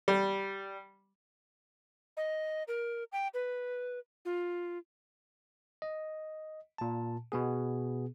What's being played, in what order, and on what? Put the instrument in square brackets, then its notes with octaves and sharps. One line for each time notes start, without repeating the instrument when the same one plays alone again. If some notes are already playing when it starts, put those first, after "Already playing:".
[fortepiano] G3
[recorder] D#5
A#4
G5
B4
F4
[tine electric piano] D#5
A#2 A5
B2 B3 G#4